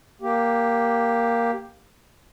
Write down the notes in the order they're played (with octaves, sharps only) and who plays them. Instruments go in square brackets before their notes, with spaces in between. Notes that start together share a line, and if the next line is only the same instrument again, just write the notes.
[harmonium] A#3 G4